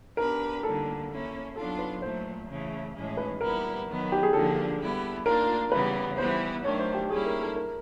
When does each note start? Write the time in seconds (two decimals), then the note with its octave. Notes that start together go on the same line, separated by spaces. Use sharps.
0.17 B3 D4 G4 A#4 B4
0.63 D3 G3 A#3 A4
1.10 A#3 C#4 E4
1.56 F#3 B3 D4 F4 A4
1.79 B4
2.02 A#2 F#3 A3 C5
2.48 C#3 E3 A3
2.94 A2 E3 G#3 C#4
3.17 B4
3.41 A#2 G3 B3 E4 A#4
3.87 D#3 F#3 B3
4.12 G4
4.23 G#4
4.33 D3 F3 A#3 D4 A4
4.79 G3 B3 E4
5.25 A#3 D4 F4 A#4
5.72 C#3 E3 G3 B3 B4
6.18 E3 G3 B3 E4 C5
6.64 D#3 F#3 A3 D4 C#5
6.79 C5
6.94 G4
7.10 G3 A#3 C#4 E4 G#4
7.26 A#4
7.41 A4
7.56 A#4